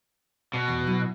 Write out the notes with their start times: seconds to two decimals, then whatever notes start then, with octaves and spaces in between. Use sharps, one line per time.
0.54 B2 D5
0.68 E2
0.87 F#3 E4